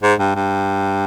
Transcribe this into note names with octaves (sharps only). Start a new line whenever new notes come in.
G#2
G2
G2